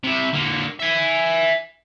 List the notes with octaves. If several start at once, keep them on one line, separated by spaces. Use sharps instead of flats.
C3 E4
D3 A#3
E5 G#5